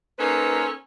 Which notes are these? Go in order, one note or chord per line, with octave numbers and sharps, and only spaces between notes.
A#3 C#4 D#4 A4 B4 C5